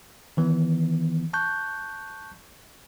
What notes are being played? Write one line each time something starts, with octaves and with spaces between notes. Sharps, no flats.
D#3 E3 B3
A5 C#6 F#6 G6